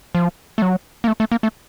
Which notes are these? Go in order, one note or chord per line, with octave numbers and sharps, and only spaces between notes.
F3
A3
F#3
A#3
A3
A3
A#3
A3